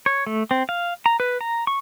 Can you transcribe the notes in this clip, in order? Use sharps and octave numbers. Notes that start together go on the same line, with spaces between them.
C#5
A3
C4
F5
A#5
B4
A#5
C#6